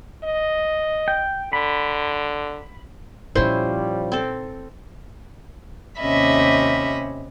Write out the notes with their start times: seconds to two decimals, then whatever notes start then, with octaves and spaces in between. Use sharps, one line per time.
0.24 D#5
1.08 G5
1.53 D3 B5
3.35 A#2 F3 G3 C#4 D#4 E4 C5
4.12 C4 A4
5.99 D#2 C3 C#4 D#5 E5 B5